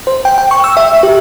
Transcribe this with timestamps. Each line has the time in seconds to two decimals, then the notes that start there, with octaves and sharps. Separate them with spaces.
0.07 C5
0.25 G5
0.38 G5
0.51 C#6
0.64 E6
0.77 E5
1.03 G4